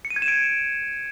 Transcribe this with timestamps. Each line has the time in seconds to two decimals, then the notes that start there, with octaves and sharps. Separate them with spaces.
0.05 C#7
0.10 D#7
0.16 G#6
0.22 E7
0.28 D7